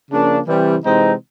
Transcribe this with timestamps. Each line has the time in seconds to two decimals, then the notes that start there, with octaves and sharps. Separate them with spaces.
0.11 C#3 F3 A#3 D4
0.47 C3 E3 G3
0.85 C3 E3 G#3 C4 D#4